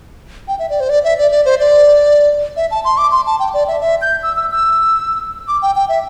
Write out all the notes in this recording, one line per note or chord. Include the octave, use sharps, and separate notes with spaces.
G5
E5
D5
C5
D5
E5
D5
D5
C5
D5
E5
A5
C6
D6
C6
A5
G5
D5
E5
E5
G6
E6
E6
E6
D6
G5
G5
E5